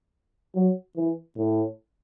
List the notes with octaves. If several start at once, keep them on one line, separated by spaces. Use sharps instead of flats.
F#3
E3
A2